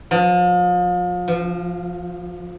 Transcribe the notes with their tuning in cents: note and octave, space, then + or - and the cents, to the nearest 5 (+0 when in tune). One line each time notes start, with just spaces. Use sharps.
F3 +35
F3 -15